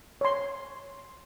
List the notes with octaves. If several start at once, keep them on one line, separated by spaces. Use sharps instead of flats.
C#5 C6